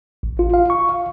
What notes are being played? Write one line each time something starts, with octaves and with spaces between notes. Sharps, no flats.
A1
F4
F5
C#6
F5